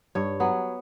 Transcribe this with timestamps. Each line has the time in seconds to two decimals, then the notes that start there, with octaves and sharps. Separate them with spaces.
0.15 G2 C#5
0.40 F#3 B3